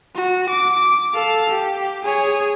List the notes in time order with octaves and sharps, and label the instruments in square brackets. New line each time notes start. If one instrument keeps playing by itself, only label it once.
[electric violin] F#4
D6
A4 F5
G4
G#4 C#5